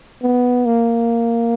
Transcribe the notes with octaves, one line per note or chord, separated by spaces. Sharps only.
B3
A#3